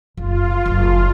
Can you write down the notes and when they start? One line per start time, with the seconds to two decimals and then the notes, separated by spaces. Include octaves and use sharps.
0.17 F#1 F4
0.65 F#1 D2